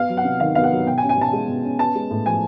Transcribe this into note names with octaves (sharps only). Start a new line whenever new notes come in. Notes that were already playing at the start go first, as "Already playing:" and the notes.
Already playing: B3 F5
F#3
F#5
C3
D#3 F5
B3 F5
F#5
F#3
B2 G5
G#5
C#4
G#5
B2 A5
G#3
B2
C#4
B3 A5
G#3
A2
F3 G#5